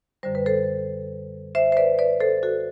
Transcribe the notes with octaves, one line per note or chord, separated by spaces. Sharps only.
F#2 D3 G3 C5
B4
A4 C5
C5 E5
C5
B4 D5
B4 D5
A4 C5
F#4 A4